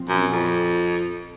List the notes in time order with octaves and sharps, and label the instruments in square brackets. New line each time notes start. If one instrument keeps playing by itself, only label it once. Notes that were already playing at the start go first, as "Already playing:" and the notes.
Already playing: [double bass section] A#2 F3 C4
[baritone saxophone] F#2
F2